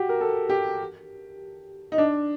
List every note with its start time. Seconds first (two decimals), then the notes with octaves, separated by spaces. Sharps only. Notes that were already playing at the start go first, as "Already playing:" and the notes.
Already playing: F#4 G4
0.09 A#4
0.21 A4
0.49 G4
1.92 D#4
1.98 D4